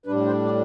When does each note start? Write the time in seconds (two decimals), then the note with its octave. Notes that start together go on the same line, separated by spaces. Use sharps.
0.06 A2 G3 D4 B4
0.26 C5
0.45 D5